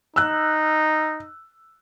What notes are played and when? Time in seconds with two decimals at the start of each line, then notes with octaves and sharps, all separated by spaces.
0.16 D#4 E6 F#6